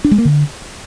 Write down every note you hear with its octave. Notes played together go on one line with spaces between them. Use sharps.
D4
G#3
A#3
D3